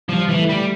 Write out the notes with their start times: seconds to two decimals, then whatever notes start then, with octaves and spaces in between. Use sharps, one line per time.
0.09 F3 G3
0.29 E3
0.39 A3
0.49 G3